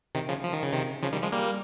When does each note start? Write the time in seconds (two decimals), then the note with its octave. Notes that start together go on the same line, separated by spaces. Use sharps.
0.15 C3 D#3
0.29 C#3 F3
0.44 F3
0.53 D#3
0.63 C#3
0.73 C3 D#3
1.03 C#3 F3
1.12 D#3 G3
1.22 F3 G#3
1.32 G3 A#3